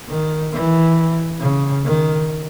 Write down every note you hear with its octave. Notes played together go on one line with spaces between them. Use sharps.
D#3
E3
C#3
D#3